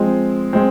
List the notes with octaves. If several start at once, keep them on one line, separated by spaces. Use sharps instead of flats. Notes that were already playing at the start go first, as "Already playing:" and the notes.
Already playing: F3 G#3 C4
G#3 C4